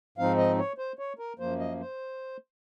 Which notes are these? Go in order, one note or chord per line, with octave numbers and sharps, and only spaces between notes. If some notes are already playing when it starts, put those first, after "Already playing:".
G#2 F3 C4 D#4 F5
D#5
C#5
C5
C#5
A#4
F#2 F3 A#3 C5
D#5
C5